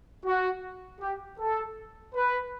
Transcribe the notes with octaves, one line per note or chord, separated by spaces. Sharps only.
F#4
G4
A4
B4